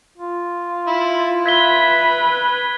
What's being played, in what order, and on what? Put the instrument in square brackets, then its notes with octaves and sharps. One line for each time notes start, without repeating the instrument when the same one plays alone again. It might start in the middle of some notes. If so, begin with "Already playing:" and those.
[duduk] F4
[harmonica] E4
[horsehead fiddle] B4 [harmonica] E5 [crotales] G#6 B6 G7